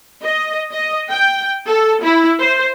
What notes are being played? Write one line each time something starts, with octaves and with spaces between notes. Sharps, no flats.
D#5
D#5
G5
A4
E4
C5